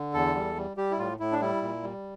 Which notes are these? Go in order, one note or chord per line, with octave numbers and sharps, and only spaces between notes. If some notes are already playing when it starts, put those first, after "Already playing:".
Already playing: D3
E2 A4
G3
G3
G3 G4
E4
A2 F4
A2 E4
D4
G3 E4
A#2
G3